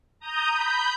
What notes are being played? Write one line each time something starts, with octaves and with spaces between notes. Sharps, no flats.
A#5 D#6 G6
B5 G6